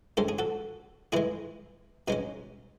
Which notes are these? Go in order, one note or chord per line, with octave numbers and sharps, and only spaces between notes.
G#2 D#3 G#3 C#4 A4
G#4
F#4 A4
A2 E3 G#3 E4 G#4
B2 G#3 C#4 D#4